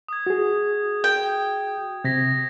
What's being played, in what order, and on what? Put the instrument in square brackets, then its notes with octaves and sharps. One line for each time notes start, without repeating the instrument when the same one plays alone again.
[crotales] D#6 G#6
[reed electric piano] F#4 G#4
[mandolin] G5
[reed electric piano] C3 [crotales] G#6 A#6 B6